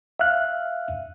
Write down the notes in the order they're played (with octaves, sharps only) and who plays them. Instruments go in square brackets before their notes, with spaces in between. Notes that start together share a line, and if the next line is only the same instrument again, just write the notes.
[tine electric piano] E5 F5 F6 F#6